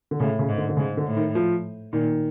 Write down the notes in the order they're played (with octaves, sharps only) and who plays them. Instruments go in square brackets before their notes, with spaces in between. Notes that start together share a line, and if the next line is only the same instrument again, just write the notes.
[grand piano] D3
[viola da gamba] A2 [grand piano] C#3
[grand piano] C#3
[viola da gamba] G#2
[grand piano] D3
D3
[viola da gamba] G#2 [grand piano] C#3
[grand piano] D3
[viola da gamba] A2
[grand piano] D#3
F3
[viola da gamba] A#2 [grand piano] D#3